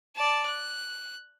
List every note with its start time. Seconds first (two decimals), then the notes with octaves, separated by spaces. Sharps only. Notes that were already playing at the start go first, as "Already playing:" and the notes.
0.16 D5 A5
0.46 F#6